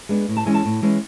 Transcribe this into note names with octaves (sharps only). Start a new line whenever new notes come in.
G#3 B3 D4
A2
A5
E3 G#3 C#4 G#5
A5
A2
E3 G#3 C#4